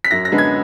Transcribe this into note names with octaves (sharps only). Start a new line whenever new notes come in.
B6
F#2 A#6
A#6
D3 G#3 B3
G#6